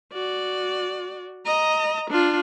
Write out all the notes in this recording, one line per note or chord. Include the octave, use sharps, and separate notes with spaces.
F#4 D5
D#5 A#5
D4 F4